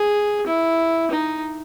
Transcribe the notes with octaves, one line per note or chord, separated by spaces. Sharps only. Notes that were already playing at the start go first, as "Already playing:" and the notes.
Already playing: G#4
E4
D#4